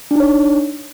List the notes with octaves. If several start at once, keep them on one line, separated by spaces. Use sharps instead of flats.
D4 D#4 C#5